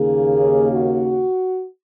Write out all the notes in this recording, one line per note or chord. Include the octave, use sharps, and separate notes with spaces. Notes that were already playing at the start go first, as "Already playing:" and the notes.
Already playing: D#2 C#3 A#3 G#4
F#4